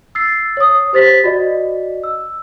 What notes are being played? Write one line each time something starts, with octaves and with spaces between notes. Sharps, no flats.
E6 A6 C7
C#5 D#6
G4 C5 A6 B6
F#4 D5 D#5
E6